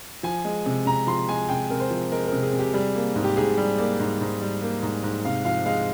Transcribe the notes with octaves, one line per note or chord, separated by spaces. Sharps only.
F3 G#5
G#3
C3
C3 A#5
F3 C6
G#3 G#5
C3 G5
C3 A#4
C5
F3
G#3 A#4
A#4
C3
G#4
C3
G4
G3 G#4
A#3
G#2
G4
G#2 G#4
G3
A#3 D5
G#2
G#2
G3
A#3
G#2
G#2
C3 F5
F3 F5
G#3 F5